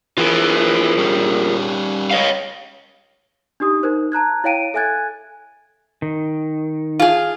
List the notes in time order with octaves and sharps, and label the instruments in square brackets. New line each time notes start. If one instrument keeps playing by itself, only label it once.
[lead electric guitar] E3 [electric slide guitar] F4 G#4 A#4
[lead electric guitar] G3 C#4
[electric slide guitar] C#5 D#5 F5
[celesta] D4 D#4 G4 D#6
D#4 A#4 C5
A5 A#5 F#6 G#6
E4 C#5 F5 G5 D7 D#7
A4 E5 G#5 F#6 G#6 A6
[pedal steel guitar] D#3
[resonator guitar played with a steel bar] F4 G#4